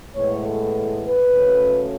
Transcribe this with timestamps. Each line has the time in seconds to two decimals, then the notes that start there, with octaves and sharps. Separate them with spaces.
0.15 A2 E3 G#3 B3 C#5
0.44 A4
1.04 B4
1.32 C#3 F#3 A3 C#4